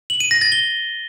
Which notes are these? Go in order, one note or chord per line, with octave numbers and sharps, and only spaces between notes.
F#7
D#7
A#6
A6
G7